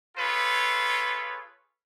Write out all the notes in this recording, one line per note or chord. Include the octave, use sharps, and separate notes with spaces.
F4 G#4 A4 B4 C#5